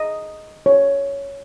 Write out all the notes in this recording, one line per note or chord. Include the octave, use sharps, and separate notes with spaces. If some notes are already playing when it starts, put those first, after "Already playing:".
Already playing: D#5
C#5